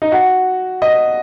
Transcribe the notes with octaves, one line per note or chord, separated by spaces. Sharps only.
D#4
F#4
D#5